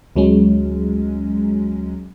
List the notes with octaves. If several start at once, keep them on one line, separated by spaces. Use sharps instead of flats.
D2 F#3 G#3 C#4